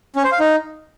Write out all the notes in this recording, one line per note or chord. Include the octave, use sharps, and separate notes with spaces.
C#4
C5
F5
D#4